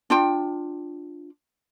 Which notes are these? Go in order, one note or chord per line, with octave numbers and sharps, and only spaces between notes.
D4 F4 G5